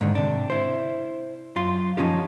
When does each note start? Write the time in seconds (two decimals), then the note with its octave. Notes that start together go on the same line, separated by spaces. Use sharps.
0.01 G#2 D3 D#3
0.15 C3 D4
0.50 E4 C5
1.56 F#2 F4 C6
1.97 F3 F#3 C#4 D#4 F4 G4